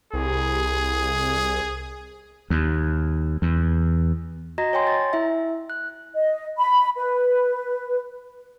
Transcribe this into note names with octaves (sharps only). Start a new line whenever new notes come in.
C2 G#4
D#2
E2
F#4 D#5 A#5 A#6
C#5 G5 G#5 C6
A6
E4 E5
F#6
D#5
B5
B4